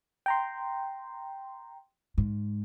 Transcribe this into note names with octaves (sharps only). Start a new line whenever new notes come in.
G5 A#5 C6
G#2